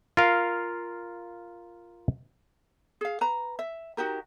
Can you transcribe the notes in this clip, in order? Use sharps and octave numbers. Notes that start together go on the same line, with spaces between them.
F4 A#4 F5
G#4 F5
B4 A#5
E5
D#4 F#4 G4 A#4